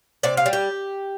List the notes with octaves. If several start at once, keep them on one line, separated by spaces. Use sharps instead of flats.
C3 D5
F5
G3
G4